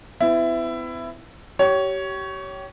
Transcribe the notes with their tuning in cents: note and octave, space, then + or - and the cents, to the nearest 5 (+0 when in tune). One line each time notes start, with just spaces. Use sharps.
B3 +45 E4 +15
G4 -30 C#5 +10